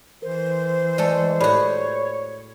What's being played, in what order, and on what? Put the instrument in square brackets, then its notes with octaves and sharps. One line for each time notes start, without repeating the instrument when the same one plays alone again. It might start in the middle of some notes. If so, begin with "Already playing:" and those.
[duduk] E3 [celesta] A#4 [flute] C5
[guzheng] G#3 A3 A4 [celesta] D5
[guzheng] A2 F#4 [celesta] G4 D5 B5 [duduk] C#5